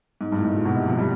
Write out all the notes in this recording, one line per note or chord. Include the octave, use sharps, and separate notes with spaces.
G#2
G2
A2
G#2
A#2
B2
C3
F3
G3